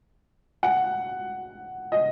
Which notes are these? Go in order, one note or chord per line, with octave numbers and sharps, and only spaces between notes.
F#5
D#5